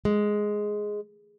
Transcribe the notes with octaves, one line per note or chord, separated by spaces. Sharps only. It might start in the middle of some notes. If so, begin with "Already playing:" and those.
G#3